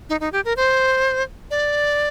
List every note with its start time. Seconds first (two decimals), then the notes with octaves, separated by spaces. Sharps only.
0.09 D#4
0.21 D#4
0.32 G4
0.45 A#4
0.57 C5
1.51 D5